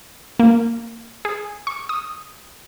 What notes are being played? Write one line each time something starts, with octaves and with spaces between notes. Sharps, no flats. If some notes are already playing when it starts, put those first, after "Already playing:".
A#3
G#4
C#6
D#6